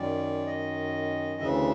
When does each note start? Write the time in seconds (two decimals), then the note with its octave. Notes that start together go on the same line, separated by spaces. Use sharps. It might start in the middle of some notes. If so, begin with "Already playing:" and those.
Already playing: F#2 D#3 D5
0.46 D#5
1.41 D2 C#3 E3 E5